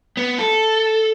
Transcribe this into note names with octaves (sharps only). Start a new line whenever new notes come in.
B3
A4